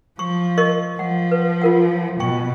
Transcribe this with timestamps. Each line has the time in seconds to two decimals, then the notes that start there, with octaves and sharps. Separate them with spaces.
0.19 F3 C#6
0.58 A#4 D#5 C#6
0.99 F3 F#5
1.31 B4
1.62 F4 A#4 F#5
2.20 B2 G5 C#6